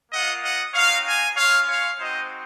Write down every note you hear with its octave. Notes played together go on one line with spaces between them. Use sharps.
A#3 F4 D#5 F#5
D#5 F#5
C4 D#4 F#4 C#5 F5
F5 G#5
G#3 C#4 F4 C#5 F5
C#5 F5
G#3 C4 D#4 F#4 C5 D#5